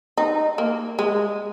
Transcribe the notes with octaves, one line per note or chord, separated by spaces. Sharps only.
D#4
A#3
G#3